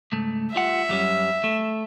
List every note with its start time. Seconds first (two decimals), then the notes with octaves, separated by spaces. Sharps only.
0.12 C#2 G#2 A3
0.55 G3 F4 E5 F#5
0.89 F#2 G3 C#4
1.44 A3